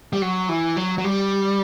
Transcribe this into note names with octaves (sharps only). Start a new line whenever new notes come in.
G3
F#3
E3
F#3
F#3
G3